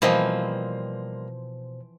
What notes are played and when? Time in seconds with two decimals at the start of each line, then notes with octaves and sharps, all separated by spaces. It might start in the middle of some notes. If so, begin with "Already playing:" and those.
0.02 B2 E3 F3 G3 A#3 C4 C5 D#5